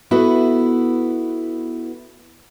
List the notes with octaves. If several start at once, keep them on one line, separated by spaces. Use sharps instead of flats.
B3 E4 F#4 A4 B4